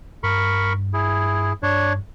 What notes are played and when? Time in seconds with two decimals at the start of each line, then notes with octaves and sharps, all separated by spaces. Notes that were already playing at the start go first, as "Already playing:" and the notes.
0.23 G2 A#4 B5 C#6
0.94 E4 G#4
1.63 G2 D4 C#5